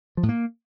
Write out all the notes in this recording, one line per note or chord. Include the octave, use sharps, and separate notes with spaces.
F3
A2
A#3